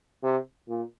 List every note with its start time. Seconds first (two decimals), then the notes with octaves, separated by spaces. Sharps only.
0.23 C3
0.68 A#2